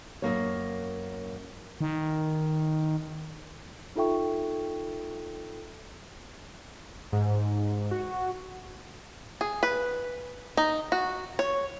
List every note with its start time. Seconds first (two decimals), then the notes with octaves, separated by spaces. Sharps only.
0.22 F#2 C3 A#3 C#5
1.81 D#3
3.96 D#4 F4 A4 E5 G5 C#6
7.12 G#2
7.91 F#4
9.41 G#4
9.63 B4
10.57 D#4
10.92 F#4
11.39 C#5